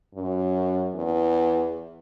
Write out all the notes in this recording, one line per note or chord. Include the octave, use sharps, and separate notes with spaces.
F#2
E2